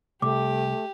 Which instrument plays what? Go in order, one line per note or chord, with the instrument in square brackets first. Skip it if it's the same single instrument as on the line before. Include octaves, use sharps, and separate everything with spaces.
[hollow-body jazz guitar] C2 [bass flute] A3 [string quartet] G4 [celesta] D6